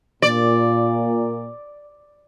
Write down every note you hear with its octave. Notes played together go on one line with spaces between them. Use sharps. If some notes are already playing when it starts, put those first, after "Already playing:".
A#2 D5